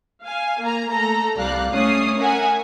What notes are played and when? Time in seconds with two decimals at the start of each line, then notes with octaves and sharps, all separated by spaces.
0.23 F5 G#5
0.62 A#3 A#5
0.90 A3 A4 A#5 A#6
1.37 C2 G3 D5 F5 F#6
1.71 A3 C#4 C#5 D#6 C7
2.20 A#4 E5 F#5 G#5